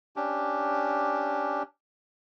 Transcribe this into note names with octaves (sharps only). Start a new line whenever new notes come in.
C#4 D4 G4